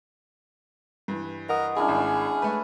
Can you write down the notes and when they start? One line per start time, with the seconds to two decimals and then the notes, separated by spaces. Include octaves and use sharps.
1.08 G2 E3
1.49 A#4 D#5 F#5 D#6
1.76 C#4 D4 E4 G#4
1.88 G#1
2.42 A3 B4